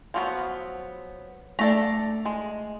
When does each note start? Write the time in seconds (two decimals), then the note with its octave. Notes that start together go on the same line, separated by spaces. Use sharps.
0.14 F3 F#3 B3
1.59 A3 D4 A4 A#5
2.25 G#3